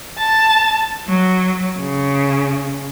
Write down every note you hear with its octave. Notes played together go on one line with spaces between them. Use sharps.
A5
F#3
C#3